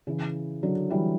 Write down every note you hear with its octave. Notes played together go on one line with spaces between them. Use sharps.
C#3 E3
D3 F#3
E3 G3